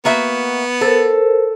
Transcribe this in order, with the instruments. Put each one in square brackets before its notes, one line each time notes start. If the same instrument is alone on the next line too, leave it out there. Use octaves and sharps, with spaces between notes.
[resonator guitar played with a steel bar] A#3 F#4 E5 [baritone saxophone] B3
[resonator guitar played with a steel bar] A4 [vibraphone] A#4 C5